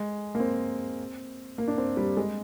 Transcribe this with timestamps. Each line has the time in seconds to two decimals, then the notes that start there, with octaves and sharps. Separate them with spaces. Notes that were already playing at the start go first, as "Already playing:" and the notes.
Already playing: G#3
0.35 A#3
0.40 C4
1.58 A#3
1.68 D4
1.78 C4
1.97 G3
2.17 G#3